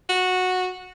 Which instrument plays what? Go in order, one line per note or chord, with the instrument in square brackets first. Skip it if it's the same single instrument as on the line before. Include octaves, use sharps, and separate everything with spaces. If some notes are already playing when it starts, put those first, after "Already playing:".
[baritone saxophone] F#4